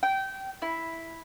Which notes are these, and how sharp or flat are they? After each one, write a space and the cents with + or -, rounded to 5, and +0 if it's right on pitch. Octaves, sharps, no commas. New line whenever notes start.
G5 -20
E4 -5